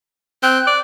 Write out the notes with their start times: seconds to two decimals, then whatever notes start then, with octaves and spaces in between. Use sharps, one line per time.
0.43 C4 F#6
0.67 D5